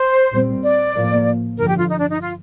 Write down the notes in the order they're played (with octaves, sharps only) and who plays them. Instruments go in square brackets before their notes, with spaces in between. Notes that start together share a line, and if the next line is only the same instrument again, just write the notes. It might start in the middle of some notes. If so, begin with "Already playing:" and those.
Already playing: [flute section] C5
[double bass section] A#2 G3 C4
[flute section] D5
[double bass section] A2 F3 A#3
[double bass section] G2 D3 F3 [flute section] A#4
[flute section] G4
F4
D#4
D4
D#4
F4